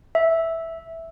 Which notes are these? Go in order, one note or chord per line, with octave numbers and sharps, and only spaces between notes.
E5